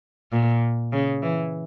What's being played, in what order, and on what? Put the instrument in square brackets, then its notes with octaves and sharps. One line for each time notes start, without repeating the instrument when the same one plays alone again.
[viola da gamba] A#2
C#3
E3